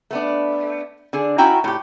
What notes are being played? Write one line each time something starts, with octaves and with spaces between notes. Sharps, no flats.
A3 B3 D4
D3 D4 G#4
C#4 E4 F#4 G5 A#5
A2 G4